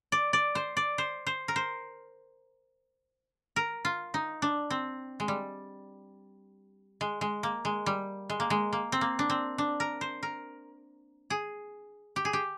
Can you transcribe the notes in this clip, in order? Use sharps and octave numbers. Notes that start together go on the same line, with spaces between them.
D5
D5
C5
D5
C5
C5
A#4
C5
A#4
F4
D#4
D4
C4
G#3
G3
G#3
G#3
A#3
G#3
G3
G#3
A#3
G#3
A#3
C4
A#3
D4
C4
D4
A#4
C5
A#4
G#4
G4
G#4
G4